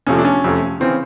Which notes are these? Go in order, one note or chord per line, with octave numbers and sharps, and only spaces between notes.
F2 C3 F3 A3 C#4
D4
C#4
F2 C3 F3 A3
C#3 E3 C4